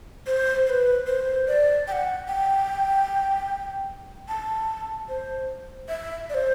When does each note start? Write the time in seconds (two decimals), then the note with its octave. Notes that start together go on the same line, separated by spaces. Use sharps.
0.27 C5
0.67 C5
0.70 B4
1.07 C5
1.48 D5
1.88 G5
1.92 F#5
2.28 G5
4.28 A5
5.09 C5
5.89 E5
6.30 D5
6.34 C5